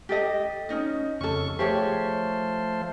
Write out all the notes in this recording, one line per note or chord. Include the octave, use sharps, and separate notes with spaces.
G4 A4 D#5
C#4 D#4 D#5
F2 C#3 C#4 A4 C#6
F3 A3 G4 G#4 C5 C#5